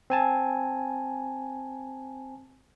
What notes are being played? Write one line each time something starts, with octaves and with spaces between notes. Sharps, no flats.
C4 G#5 A5